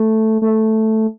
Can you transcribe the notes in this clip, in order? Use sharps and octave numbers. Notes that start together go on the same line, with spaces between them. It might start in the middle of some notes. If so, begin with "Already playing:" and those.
Already playing: A3
A3